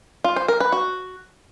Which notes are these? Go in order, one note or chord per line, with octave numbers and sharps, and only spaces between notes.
F4
C5
A#4
B4
F#4